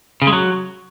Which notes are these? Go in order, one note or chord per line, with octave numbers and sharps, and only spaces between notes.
C#3
G#3
F#3